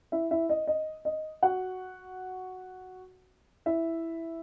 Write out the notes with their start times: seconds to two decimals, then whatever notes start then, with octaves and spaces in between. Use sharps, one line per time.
0.12 E4 E5
0.31 E4 E5
0.49 D#5
0.67 D#5
1.05 D#5
1.43 F#4 F#5
3.66 E4 E5